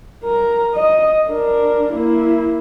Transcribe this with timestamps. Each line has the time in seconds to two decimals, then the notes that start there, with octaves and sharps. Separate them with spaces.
0.23 A#4 A#5
0.75 D#5
1.28 D4 A#4
1.93 A#3 E4